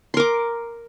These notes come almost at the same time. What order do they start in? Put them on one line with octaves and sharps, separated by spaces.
C6 A#4 D6